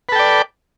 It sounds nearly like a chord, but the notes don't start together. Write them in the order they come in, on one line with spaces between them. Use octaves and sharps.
B4 A4 G5 D5